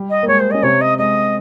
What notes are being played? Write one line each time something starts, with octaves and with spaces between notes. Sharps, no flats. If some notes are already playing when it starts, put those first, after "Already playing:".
Already playing: G3 G4
D#5
A#3
G#3 C#5
C5
C#4 D#5
C3 C4 C#5
D#5
G#3 D#5